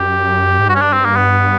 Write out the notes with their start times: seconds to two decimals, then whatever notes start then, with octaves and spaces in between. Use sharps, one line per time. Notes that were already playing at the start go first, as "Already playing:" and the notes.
Already playing: F#2 G4
0.59 G#2
0.69 G2 F#4
0.75 C#4
0.82 D4
0.93 C4
1.05 A#3
1.17 B3